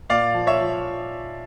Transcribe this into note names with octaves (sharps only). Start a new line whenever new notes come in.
A#2 D5 F5
F3
C#5 E5
F3